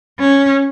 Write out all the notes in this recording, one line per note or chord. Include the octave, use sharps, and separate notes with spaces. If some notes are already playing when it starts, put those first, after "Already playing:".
C#4